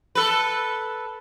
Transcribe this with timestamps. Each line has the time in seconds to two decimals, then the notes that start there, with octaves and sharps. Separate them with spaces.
0.15 A4 B4